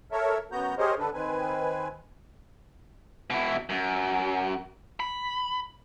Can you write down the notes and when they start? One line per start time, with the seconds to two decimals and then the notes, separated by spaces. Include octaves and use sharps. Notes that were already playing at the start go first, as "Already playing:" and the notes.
0.12 A4 A#4 C#5 E5
0.52 F#2 B3 F#4 A#5 G6
0.78 G4 G#4 A#4 C5 C#5 D#5
0.99 D3 D4 A4 B4
1.13 D#3 C4 B4 G#5
3.31 B2 E4
3.70 F#2
5.00 B5